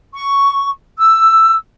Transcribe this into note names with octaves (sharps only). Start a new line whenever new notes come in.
C#6
E6